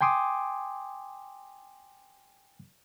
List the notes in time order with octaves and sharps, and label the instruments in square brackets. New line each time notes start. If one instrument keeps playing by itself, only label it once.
[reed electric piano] G5 G#5 C6 D6 D#6